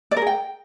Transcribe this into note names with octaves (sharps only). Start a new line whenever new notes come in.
D5
A#4
G#4
G5